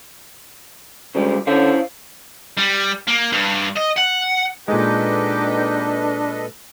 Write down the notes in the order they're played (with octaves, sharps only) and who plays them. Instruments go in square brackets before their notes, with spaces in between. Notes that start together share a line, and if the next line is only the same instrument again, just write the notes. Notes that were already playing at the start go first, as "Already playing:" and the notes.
[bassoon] D2 [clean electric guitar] C#3 G3 G#3
[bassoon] D3 [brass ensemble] C#4 [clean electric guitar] E4 C5 F5
[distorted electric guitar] G3
A#3
G2
D#5
F#5
[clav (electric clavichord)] A#2 G#3 [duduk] D4 [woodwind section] D#4 G4 [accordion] A4 B4 D#5